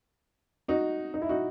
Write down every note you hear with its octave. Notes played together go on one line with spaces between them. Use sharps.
D#4 F#4
D#4
E4
D#4 F#4